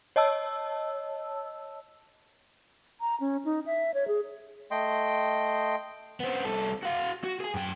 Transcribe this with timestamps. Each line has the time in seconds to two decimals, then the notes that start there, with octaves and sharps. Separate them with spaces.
0.16 C#5 D#5 A5 E6
3.01 A#5
3.20 C#4
3.45 D#4
3.66 E5
3.94 C#5
4.08 G#4
4.71 A3 D#5 G5 C6
6.20 B3 C4
6.45 C2 A4
6.83 F#4 F5
7.24 F#4
7.40 G#4 G#5
7.54 F#2 G5